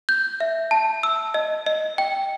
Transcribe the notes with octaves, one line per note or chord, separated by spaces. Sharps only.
G6
E5
A5
E6
D#5
D#5
G5